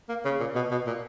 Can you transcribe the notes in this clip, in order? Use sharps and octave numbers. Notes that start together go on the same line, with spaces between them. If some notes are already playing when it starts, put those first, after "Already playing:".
A#3
C#3
A#2
B2
B2
A#2